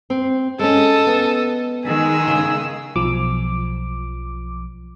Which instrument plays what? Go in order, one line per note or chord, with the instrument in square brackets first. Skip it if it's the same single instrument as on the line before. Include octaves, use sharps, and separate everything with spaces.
[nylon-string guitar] C4
[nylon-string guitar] G#3 C#4 [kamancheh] A4 D#5
[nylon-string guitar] B3
[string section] D#3 G#3 [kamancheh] G#4 E6
[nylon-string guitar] C#3
[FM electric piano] B1 F3 D6